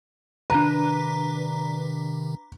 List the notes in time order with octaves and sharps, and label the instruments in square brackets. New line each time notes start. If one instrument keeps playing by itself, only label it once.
[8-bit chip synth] C3 D#3 [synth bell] D4 B4 [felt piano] A#5